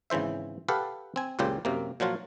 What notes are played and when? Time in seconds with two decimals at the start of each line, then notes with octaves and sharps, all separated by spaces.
0.10 G#1 C#3 E3 C5 E5
0.68 G4 A4 B4 F5 F#5
1.16 C4 G#5
1.39 C#2 F#2 A#2 C#3 G4 C5
1.65 F#2 C3 A#3
2.00 A#2 F3 F#3 F4 F#4